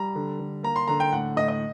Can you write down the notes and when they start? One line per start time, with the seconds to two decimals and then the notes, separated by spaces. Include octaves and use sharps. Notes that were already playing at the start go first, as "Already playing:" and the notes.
Already playing: G3 A#5
0.15 D3
0.39 D3
0.63 A#3 A#5
0.76 C6
0.88 D3 A#5
1.00 G5
1.13 A2 F#5
1.36 A2 D#5
1.48 D#5